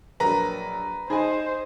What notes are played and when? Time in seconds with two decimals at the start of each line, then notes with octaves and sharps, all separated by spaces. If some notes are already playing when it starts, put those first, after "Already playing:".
0.20 A#1 F#3 A#4 B4 A#5
1.10 D#4 G#4 C5 D#5 G#5